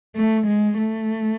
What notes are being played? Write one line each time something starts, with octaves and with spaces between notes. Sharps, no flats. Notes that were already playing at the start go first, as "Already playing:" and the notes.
A3
G#3
A3